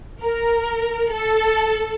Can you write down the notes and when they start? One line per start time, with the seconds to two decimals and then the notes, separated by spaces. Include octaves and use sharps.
0.21 A#4
1.12 A4